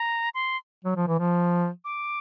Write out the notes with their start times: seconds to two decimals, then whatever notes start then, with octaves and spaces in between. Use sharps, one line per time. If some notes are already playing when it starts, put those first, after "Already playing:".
Already playing: A#5
0.35 C6
0.85 F#3
0.96 F3
1.08 E3
1.19 F3
1.85 D6